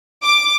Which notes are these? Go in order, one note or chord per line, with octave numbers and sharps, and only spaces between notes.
D6